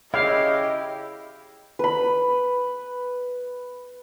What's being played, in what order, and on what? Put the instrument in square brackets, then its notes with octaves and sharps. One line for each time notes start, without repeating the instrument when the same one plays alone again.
[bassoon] C#3 [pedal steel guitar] E4 G4 [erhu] D#5 [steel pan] F5
[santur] B4 B5